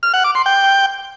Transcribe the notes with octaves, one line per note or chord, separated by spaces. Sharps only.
F6
F#5
D6
C6
G5